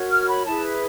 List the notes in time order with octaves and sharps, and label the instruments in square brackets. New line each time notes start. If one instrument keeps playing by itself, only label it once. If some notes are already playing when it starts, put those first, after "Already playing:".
Already playing: [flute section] F#4 A#4 C#5
F6
B5
E4 G#4 B4 A5